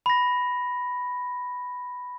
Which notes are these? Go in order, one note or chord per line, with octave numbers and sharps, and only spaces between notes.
B5 A#6